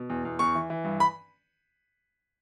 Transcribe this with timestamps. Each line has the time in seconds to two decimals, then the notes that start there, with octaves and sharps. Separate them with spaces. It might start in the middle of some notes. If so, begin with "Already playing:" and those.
Already playing: B2
0.10 E2
0.25 E2
0.39 E2 C#6
0.55 E3
0.70 E3
0.84 G2
1.00 B5